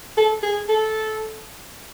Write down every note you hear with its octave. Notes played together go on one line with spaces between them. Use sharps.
A4
G#4
A4